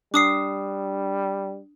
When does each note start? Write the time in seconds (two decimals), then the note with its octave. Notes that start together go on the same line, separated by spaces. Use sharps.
0.14 G3 D4 D6 D#6 C7